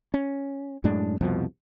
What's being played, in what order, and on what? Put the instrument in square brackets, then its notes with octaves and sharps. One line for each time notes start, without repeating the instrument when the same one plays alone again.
[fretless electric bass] C#4
F#2 A2 G#3 D4
C2 F2 B2 F3